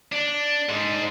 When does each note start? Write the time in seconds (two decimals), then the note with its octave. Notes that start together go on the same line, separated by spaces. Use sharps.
0.12 D4
0.69 G#2 G#3